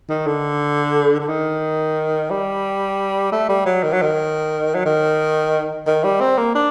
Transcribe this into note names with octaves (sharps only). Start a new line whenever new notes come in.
D#3
D3
D3
D#3
G3
A3
G3
F#3
D#3
F#3
D#3
F#3
D#3
D#3
G3
C4
A#3
D4